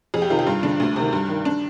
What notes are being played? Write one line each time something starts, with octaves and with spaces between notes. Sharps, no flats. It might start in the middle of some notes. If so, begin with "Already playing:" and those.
F2 G#4
G4
C3 D#3 F4
G4
G2 F4
D3 D4
D2
C3 D#3
G2
D#3
D4